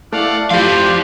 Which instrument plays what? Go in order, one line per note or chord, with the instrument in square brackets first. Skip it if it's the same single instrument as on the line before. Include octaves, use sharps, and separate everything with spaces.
[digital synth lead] A3 [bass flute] E4 [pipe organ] D5 F5 F#5
[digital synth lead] F3 [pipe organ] C4 C5 D5 [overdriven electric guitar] G4 F5